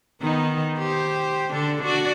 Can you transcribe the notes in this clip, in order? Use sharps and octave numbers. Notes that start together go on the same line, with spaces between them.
D#3 B3 D#4
G4 C5
D3 D4 A4
D4 F#4 D5